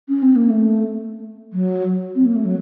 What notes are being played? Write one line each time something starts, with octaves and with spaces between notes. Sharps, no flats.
C#4
C4
A#3
A3
F#3
C4
A#3
A3
F#3